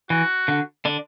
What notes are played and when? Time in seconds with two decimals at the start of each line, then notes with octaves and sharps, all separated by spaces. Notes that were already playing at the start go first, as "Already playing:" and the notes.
0.10 E3 F#4
0.48 D3
0.85 D3 D4